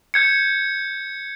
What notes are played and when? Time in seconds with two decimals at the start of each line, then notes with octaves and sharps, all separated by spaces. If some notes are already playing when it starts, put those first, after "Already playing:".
0.14 G6 G#6 C#7